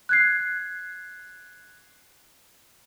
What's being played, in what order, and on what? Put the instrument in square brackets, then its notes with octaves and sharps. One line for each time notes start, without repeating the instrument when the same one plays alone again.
[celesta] F#6 G#6 C7